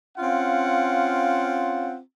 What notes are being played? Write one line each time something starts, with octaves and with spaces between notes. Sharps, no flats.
C4 C#4 F4 F5 F#5